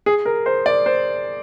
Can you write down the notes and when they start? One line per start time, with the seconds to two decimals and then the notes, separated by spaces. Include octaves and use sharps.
0.06 G#4
0.25 A#4
0.46 C5
0.66 D5
0.86 C5